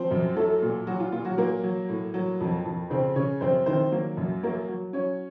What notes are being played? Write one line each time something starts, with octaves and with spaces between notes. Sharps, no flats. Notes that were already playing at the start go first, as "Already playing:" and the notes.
Already playing: F3 C4 C5
F#2
F#3 A3 A4
A#2
F#3 F#4
F4
A#2 F4
F#3 F#4
F#3 A#3 A#4
F#3
A2
F#3
F2
F2
C#3 C4 C5
C#3 C#4 C#5
F#2 C4 C5
D#3 C4 C5
F#3 A#3 A#4
F#2
F#3 A#3 A#4
F#3
F#3 C#4 C#5